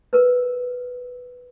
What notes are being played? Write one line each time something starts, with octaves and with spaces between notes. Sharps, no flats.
A#4 B4